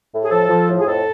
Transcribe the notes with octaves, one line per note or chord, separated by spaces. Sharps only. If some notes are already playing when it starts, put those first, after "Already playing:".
A2
G#4
F3 A4
F3
A2
G#4
F2 A4